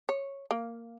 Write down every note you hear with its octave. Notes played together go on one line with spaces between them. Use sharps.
C#5
A#3